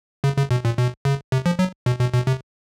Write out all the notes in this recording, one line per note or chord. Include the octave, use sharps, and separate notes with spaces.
C#3
C#3
B2
A#2
B2
C#3
C3
F3
F#3
B2
B2
B2
C3